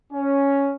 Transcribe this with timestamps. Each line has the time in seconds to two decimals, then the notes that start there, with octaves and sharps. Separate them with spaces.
0.13 C#4